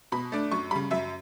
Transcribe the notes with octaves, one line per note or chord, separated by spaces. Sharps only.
B2 B5
A3 D4
F#2 C#6
C#3 G3 B5
F#2 E5